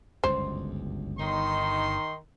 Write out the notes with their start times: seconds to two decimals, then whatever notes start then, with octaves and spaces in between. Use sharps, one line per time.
0.24 G1 C#2 F#2 C5
1.19 G1 D#3 D#4 C6